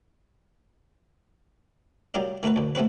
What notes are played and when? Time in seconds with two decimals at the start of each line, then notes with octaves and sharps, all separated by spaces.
2.14 F#3 G3 F4 G4 A#4 D#5
2.43 D#3 A3 F#4 A#4 B4
2.56 D2 A#2
2.75 A3 B3 C4 F#4 B4